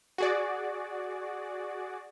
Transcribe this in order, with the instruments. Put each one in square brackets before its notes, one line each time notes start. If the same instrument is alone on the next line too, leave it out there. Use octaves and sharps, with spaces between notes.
[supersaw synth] F#4 G#4 D5